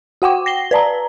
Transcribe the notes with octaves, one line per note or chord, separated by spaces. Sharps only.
F#4 F#5 G5 D6
A#6 C7 G7
B4 D5 A5 A#5